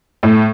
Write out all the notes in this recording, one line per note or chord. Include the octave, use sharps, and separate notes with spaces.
A2